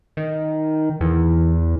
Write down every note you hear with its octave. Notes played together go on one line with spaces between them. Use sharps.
D#3
E2 E3